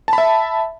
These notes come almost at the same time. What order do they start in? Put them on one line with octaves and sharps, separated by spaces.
A5 B5 E5